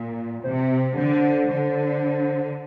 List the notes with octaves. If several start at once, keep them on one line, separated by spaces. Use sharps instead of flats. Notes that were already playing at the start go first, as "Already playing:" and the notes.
Already playing: A#2
C3 C5
D3 C5
D3